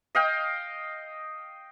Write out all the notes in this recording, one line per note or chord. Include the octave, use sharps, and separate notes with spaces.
D#5 F5 G5